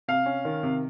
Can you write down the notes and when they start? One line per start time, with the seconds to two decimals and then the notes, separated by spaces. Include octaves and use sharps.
0.08 C3 F5
0.26 C#4
0.45 D#3
0.63 C3